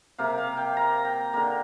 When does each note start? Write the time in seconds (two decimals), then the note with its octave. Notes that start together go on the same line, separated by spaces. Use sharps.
0.18 C3 A#3 F5
0.38 F5
0.57 G5
0.77 A#5
1.05 G5
1.33 D3 A#3 A#5